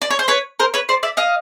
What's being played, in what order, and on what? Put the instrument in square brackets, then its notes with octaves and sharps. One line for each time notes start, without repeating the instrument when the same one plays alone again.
[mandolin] D5
C#5
C5
B4 C#5
A#4 C5
B4 C#5
C5 D5
D5 E5
D#5 F5